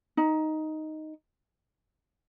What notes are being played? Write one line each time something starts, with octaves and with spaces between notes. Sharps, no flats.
D#4